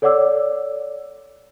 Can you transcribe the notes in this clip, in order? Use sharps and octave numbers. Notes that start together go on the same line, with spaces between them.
A4 C#5 D5 F#5 D6 E6